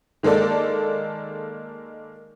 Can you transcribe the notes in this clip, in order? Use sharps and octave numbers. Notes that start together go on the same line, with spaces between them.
D#3 G#3 A#3 A4 D5